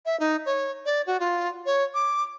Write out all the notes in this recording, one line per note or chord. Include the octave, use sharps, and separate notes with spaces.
E5
D#4
C#5
D5
F#4
F4
C#5
D6